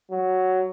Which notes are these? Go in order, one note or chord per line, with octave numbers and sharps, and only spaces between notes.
F#3